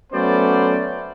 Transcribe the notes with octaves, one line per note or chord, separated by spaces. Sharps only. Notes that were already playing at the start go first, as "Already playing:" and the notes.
F#3 A3 B3 C#4 C5 D5